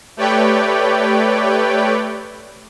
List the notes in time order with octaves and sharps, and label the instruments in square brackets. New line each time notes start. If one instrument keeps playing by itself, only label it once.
[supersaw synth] A3 G4 B4 C#5 D5 G5